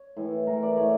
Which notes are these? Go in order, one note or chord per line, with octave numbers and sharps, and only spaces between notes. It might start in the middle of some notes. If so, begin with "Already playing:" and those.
Already playing: C#5
A2 E3 A3
A2 E3 A3 A#4
D5
A2 E3 A3 C#5